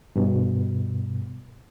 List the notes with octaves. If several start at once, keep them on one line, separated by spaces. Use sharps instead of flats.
G2 B2